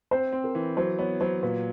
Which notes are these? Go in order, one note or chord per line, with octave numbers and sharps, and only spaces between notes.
C4 C5
C4
A#4
E3
F#3 C5
B3 C#5
F#3 C5
A#2 B4